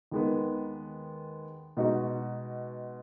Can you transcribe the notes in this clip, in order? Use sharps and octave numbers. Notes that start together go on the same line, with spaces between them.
D#2 D#3 G#3 B3
B2 G#3 D#4 F#4